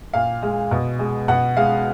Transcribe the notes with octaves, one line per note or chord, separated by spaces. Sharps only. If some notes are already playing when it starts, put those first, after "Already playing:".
A#2 F5
G#3
B2
G#3
B2 F#5
G#3 F5